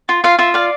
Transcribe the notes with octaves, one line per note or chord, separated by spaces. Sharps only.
F4
F4 F5
F4 E5
D5 F5